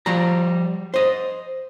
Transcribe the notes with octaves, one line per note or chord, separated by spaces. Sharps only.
F3 G3 A#5
C5 D#5